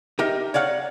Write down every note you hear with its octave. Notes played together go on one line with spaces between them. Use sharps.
D#4 G4 A#4 E5
C#5 D5 F5 F#5